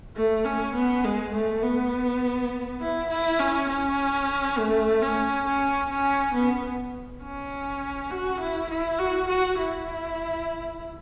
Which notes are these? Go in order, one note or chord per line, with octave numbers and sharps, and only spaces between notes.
A3
C#4
B3
G#3
A3
B3
E4
E4
C#4
C#4
A3
C#4
C#4
C#4
B3
C#4
F#4
E4
E4
F#4
F#4
E4